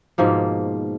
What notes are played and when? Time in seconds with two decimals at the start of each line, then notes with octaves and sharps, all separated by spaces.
0.18 G#2 B2 F3 A#3